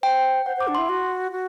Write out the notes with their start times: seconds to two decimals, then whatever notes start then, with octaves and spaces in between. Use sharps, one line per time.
0.03 C5 G5
0.46 C5 F#5
0.57 C5 D6
0.68 D4
0.75 E4 C6
0.89 F#4
1.32 F#4